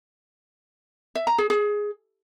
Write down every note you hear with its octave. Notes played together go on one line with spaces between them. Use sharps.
E5
A#5
G#4
G#4